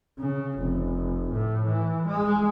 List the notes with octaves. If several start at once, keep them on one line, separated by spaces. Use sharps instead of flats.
C#3
F1
A2
E3
G#3